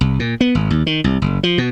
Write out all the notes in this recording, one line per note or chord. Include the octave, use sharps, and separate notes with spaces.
C2
A#2
B3
G#1
D#2
D#3
C2
F#1
F3
B2